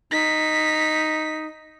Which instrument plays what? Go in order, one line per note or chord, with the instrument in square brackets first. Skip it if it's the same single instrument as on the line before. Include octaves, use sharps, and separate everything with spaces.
[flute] D#4 [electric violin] B6